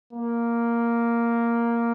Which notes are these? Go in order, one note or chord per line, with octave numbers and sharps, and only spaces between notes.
A#3